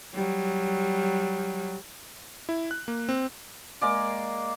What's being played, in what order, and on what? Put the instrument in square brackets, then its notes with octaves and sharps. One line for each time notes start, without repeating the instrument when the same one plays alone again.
[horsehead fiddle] F#3 G3
[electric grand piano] E4
F#6
A#3
C4
[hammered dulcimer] G#3 A#3 D5